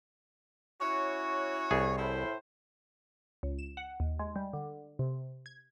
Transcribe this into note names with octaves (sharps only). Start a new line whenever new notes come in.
C#4 E4 F#4 C#5
C2 G#4
A2 E4 C5
C#2
E7
F#5
D#2
G#3
G3
D3
C3
G#6